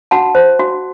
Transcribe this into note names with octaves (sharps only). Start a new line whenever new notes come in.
F#4 F#5 A5
C5
F#4